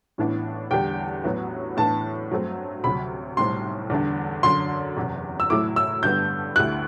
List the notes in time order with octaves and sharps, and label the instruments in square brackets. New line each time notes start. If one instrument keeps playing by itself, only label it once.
[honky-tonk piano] A1 A2 E3 B3 D4
[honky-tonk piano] E2 D3 G3 D4 G4 [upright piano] G5
[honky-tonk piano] A1 A2 F#3 B3 F#4
[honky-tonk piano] A2 E3 B3 D4 [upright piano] A5
[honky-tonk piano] G2 F#3 A3 C4
[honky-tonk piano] D2 C3 F#3 [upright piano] B5
[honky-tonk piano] B1 A2 G3 C4 [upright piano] C6
[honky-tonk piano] E2 D3 G3 D4
[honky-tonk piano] F#2 D3 F#3 [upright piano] C6
[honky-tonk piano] F#1 E2 C3
[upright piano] E6
[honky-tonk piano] A2 F#3 A3 E4 [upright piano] D6
[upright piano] E6
[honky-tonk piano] G2 D3 G3 B3 [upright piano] G6
[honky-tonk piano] D2 D3 A3 E4 G4 [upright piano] F#6